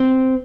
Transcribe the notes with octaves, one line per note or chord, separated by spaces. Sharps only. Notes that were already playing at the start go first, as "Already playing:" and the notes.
Already playing: C4